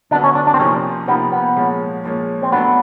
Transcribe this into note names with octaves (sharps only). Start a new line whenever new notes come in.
D3 F#3 B3 D4
C#4
D4
D4
C4
C3 F3 A#3 C#4 D#4
C3 F3 A#3 B3 D#4
B3
A#2 F3 G#3 C#4
A#2 F3 G#3 C#4
C4
F#3 A3 B3 D4